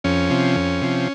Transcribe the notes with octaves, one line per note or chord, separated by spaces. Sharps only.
F2 C#4
C3 F3
F2
C3 F3